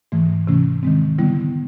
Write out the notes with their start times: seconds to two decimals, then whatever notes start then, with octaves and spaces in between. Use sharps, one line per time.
0.12 G#2 E3 A3
0.47 C3 E3 A3 C#4
0.83 D#3 G#3 C4
1.18 D3 G3 B3 E4